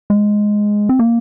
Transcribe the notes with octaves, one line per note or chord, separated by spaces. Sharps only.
G#3
C4
A#3